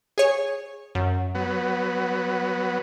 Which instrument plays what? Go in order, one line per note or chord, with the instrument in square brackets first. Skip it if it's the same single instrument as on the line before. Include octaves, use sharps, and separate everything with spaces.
[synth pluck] G#4 C#5
F#2
[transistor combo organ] F#3 B3